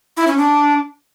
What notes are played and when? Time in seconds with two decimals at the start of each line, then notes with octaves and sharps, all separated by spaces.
0.17 E4
0.27 C#4
0.38 D4